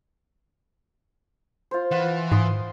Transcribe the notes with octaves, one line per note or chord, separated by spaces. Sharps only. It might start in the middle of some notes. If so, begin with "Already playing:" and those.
F4 C5
E3 F4 F#5
G#2 C6 D#6